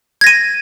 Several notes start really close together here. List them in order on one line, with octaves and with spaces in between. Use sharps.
G#6 A#6 D#7